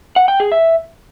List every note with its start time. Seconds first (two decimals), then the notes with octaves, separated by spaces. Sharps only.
0.16 F#5
0.28 G5
0.40 G#4
0.52 E5